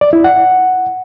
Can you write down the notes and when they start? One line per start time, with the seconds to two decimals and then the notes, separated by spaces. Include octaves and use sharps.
0.01 D5
0.13 E4
0.24 F#5